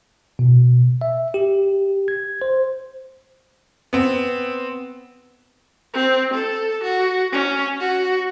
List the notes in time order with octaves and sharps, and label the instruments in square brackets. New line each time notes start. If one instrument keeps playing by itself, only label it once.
[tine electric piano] B2
E5
G4
G#6
C5
[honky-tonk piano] B3 C4
[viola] C4
A4
F#4
C#4
F#4